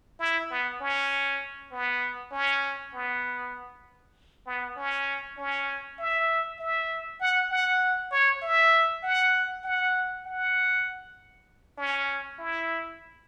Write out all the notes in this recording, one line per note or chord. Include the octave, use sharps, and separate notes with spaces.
E4
B3
C#4
B3
C#4
B3
B3
C#4
C#4
E5
E5
F#5
F#5
C#5
E5
F#5
F#5
F#5
C#4
E4